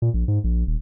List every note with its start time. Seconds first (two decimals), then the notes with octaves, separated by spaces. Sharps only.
0.02 A#2
0.14 A#1
0.28 G#2
0.44 A#1
0.67 D#1